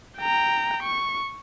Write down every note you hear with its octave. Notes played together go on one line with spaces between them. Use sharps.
G5 A#5
C#6